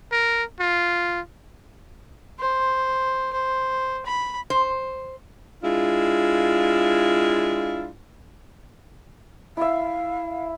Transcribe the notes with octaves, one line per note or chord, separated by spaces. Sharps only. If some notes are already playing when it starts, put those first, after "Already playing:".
A#4
F4
C5
C5
B5
C5
G#3 D4 E4 F4
E4 E5 F5